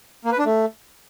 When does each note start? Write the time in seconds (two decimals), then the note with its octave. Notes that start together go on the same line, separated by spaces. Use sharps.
0.25 A#3
0.32 B4
0.39 D4
0.46 A3